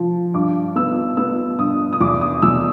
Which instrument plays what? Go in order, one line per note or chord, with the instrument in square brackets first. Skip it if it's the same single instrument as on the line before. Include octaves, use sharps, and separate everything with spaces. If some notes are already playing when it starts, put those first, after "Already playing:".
Already playing: [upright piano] F3
G2 D6
B3 E6
B3 E6
G2 D#6
D#6
E2 D6
D#6
E2 E6